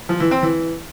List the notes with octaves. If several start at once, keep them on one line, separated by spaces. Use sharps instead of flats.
F3
E3
C4
E3